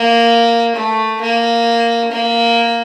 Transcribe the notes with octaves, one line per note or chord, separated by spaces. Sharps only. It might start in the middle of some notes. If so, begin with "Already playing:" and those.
Already playing: A#3
A3
A#3
A#3